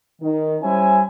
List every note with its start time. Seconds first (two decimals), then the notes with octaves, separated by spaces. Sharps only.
0.21 D#3
0.62 G3 C#4 E4 C5 G#5